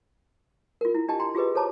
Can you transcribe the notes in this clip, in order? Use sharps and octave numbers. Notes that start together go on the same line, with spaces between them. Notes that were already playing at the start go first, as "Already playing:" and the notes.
F4 A#4
E4
D4 G4 D#5 G5 A5
G5 A#5 C6
F4 G4 G#4 B4 D#5
A4 C5 C#5 A5 A#5 D6